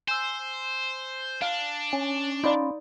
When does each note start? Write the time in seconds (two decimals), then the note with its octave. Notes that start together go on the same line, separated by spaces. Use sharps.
0.08 C5 G#5 E6
1.42 D4 F5
1.93 C#4 C#5
2.44 D#4 D5 F5 B5 C6